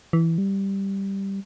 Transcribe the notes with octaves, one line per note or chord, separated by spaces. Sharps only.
E3
G3